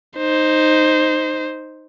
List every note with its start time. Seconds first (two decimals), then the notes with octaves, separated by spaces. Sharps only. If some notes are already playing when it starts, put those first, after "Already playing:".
0.18 D#4 C5